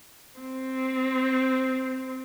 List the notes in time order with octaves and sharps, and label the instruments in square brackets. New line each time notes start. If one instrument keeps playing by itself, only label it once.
[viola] C4